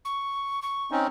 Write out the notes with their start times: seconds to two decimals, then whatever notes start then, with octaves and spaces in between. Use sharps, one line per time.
0.05 C#6
0.62 C#6
0.91 C4 C#4 D#4